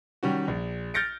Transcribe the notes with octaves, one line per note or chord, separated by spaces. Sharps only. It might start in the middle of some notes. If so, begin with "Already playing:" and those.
D#3 G3 C#4 F#4
A#1
F6 G6 A6 A#6 C#7 D7